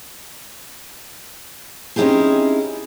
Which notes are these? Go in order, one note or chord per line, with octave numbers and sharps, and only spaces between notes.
C4 C#4 D#4 E4 G4 G#4